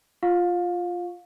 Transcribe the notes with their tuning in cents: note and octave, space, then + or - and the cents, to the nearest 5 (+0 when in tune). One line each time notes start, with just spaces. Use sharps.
F4 +0 F5 +25 C#6 +0